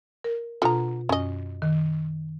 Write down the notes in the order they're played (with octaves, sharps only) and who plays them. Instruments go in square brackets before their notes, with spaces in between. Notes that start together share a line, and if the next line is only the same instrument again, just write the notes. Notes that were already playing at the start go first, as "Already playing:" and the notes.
[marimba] A#4
[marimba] B2 F4 [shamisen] D3 A#5
[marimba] F#2 [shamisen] C#4 D#5
[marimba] D#3